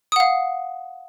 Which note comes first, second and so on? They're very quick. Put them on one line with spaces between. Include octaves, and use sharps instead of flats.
D#6 F#5 F5